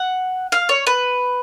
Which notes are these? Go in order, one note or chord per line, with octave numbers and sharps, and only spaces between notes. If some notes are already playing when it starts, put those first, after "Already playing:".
Already playing: F#5
F5
C#5
B4